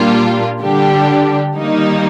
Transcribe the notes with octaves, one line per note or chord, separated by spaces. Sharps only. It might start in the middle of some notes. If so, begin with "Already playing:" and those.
Already playing: A#2 G3 A#3 D4 F4
D3 G3 D4 G4
D#3 G3 A#3 D#4